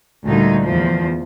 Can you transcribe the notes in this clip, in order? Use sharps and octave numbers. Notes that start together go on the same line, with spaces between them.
D2 A#2 G3 D#4
E2 F3